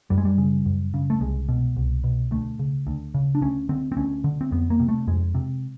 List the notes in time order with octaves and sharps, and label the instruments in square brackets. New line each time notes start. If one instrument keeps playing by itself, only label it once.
[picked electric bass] F#2 G3
G#3
G3
C#3
F#2
C#3
A3
C2 G#3
B2
C2
B2
D2 A3
C#3
D2
C#3
D4
D2 C#4
D3 C4
C4
D2 C#4
D3
C4
F2 B3
A#3
C3
A3
F2 G#3
C3